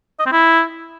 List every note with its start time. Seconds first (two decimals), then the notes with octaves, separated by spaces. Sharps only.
0.20 D#5
0.26 C4
0.32 E4